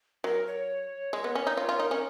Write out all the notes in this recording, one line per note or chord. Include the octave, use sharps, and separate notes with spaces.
F#3 A#4
C#5
G#3
B3
C#4
D#4
F4 C#5
F4
D#4 A#4
C#4